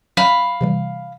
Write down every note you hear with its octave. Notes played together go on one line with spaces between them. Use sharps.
F#3 C#4 E5 F5 B5
C3 E3 G3